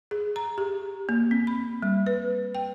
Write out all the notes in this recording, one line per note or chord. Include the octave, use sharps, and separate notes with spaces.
G#4
A#5
G4
A#3
C4
B5
G3
B4
G5